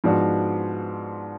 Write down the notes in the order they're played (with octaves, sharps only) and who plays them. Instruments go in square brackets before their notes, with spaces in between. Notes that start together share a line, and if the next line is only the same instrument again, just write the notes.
[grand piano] G#2 F3 B3 D4 F#4